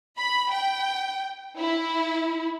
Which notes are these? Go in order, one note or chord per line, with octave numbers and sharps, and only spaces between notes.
B5
G5
E4